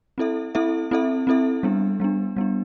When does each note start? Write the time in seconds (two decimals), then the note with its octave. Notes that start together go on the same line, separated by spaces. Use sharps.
0.18 C4 E4 A4 E5
0.55 C4 E4 A4 E5
0.91 C4 E4 A4 E5
1.27 C4 E4 A4 E5
1.63 G3 B3 D4
2.00 G3 B3 D4
2.37 G3 B3 D4